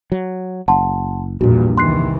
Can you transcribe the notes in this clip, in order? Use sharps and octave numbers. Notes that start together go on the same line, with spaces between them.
F#3
F#1 F#5 A5 C6
A#1 E2 G2 A#2 F#4
C2 D#3 E3 C6 F#6 C7